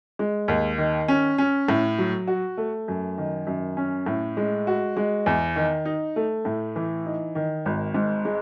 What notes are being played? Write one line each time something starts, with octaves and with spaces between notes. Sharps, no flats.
G#3
D#2
D#3
C#4
C#4
A2
F#3
F#4
A3
F#2
D#3
F#2
C#4
A2
G#3
F#4
G#3
E2
D#3
D#4
A3
A2
E3
D#4
D#3
G#1
G#2
G#3